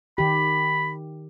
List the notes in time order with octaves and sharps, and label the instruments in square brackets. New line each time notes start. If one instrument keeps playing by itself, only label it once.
[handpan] D#3 G4 [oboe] B5